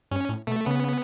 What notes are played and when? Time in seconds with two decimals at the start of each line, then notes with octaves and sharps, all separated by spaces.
0.11 G2 C#4
0.29 A2
0.47 B2 A3
0.66 C#3 B3